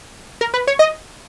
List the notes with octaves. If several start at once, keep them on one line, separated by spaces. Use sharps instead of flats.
A#4
B4
C#5
D#5